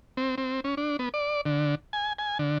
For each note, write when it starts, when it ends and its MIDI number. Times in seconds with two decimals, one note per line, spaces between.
0.17 0.35 60
0.38 0.60 60
0.64 0.75 61
0.77 0.97 62
0.99 1.09 59
1.14 1.41 74
1.46 1.75 50
1.93 2.13 80
2.19 2.38 80
2.39 2.58 50